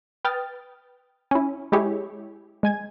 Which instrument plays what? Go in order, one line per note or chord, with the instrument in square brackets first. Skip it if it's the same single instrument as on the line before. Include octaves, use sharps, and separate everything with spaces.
[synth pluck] B4 G5 D#6 F6 A6
C#4 E4
G#3 E4 G4 G#4 C#5
G#3 G#5 G#6